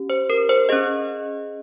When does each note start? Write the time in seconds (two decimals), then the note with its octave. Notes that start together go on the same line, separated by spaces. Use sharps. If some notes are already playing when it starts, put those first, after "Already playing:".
Already playing: C#4 G4
0.10 C5
0.30 A#4
0.49 C5
0.69 C#4 G#4 D#5